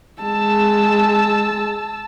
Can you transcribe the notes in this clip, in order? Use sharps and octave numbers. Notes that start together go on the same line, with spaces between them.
G#3 A5 E6